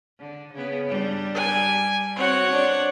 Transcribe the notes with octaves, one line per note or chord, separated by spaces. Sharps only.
D3
C#3 B3
G2 G3 D4
G#5
C4 F#4 C#5 F#5
D4 C5 D5